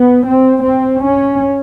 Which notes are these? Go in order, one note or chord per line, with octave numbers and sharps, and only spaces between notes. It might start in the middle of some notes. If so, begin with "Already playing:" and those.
Already playing: B3
C4
C4
C#4